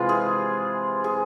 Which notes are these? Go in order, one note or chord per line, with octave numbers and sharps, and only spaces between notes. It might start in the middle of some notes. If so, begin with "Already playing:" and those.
Already playing: C3 E3 G#3 F4
G#4
G#4